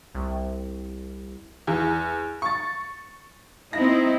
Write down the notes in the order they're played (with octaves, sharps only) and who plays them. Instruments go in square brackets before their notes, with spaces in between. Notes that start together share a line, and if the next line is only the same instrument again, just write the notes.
[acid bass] C2
[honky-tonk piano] E2
C#6 A6
[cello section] C4 D#4 E4 [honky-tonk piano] A#6